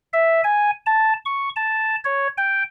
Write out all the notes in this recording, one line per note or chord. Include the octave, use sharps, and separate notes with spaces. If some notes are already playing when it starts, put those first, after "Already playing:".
E5
G#5
A5
C#6
A5
C#5
G5